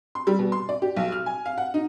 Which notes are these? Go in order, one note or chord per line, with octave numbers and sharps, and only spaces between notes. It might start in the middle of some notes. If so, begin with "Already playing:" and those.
C6
G3
B2
C6
D5
G4
B1
F6
G#5
F5
F#5
D#4